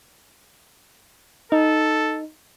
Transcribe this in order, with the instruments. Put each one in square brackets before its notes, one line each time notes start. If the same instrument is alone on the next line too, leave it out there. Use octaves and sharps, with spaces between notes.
[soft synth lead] D#4 [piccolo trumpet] A4